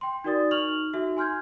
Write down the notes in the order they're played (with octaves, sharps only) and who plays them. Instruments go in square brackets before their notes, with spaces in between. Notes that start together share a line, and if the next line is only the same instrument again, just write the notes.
[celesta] G5 C6
D#4 F#4 A#4 D5 D#6 A6
D#4 C#6 F6 F7 F#7
D#4 F#4 A4 E5
G#5 C6 F6 G6 G#6